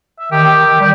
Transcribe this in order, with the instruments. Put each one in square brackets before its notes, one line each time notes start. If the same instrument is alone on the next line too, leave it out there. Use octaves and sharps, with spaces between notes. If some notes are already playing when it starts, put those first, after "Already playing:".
[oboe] E5
[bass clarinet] D#3 [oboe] G4
[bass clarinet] D#3
[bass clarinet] G3 [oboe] G5